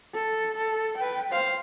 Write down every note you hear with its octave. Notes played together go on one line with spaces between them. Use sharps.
A4
A4
B4 G5
C5 F5